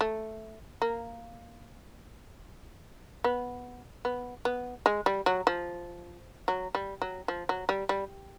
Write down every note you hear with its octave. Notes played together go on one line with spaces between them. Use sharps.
A3
A#3
B3
B3
B3
G#3
G3
F#3
F3
F#3
G3
F#3
F3
F#3
G3
G3